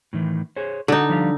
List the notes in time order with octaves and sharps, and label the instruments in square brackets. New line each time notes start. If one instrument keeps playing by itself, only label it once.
[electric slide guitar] A2 D#3 E3
G#4 C5 C#5
[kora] D3 D#4 [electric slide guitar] F#4 F#5
[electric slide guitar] F3 G3 F5